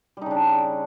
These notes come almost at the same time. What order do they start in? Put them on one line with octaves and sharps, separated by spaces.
G3 D#4 C#3 D4